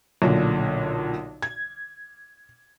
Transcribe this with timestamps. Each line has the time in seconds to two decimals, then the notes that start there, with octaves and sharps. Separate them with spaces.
0.22 B1 A#2 D3
1.42 G#6